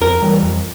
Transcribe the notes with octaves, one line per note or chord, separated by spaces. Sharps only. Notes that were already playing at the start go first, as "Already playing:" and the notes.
F2 A#4
E3 G3
F2